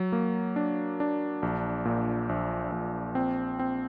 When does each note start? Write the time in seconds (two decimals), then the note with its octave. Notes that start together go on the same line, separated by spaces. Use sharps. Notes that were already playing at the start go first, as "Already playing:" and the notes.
Already playing: F#3
0.12 A#3
0.56 D4
1.00 D4
1.42 A#1
1.85 A#2
2.29 A#1
2.72 A#1
3.15 C4
3.59 C4